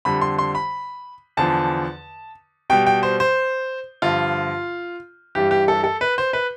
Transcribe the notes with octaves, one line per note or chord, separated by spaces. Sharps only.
F2 D3 G3 B5
C6
C6
B5
E2 D3 F3 A5
B2 G3 G5
G5
C5
C5
G2 D3 F3 F4
G2 E3 G3 G4
G4
A4
A4
B4
C5
B4